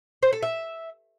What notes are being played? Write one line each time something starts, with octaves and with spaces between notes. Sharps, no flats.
C5
A4
E5